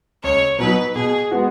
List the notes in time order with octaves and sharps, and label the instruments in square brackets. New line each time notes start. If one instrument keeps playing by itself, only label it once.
[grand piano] C#2 [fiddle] C#5
[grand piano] B2 F#3 D#4 [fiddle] B4
[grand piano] B2 [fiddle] G#4
[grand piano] G#3 B3 F#4